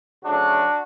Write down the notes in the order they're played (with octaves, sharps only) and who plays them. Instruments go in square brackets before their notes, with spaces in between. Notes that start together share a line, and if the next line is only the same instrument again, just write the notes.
[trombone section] D2 C#3 F#3 A3 D4 F#4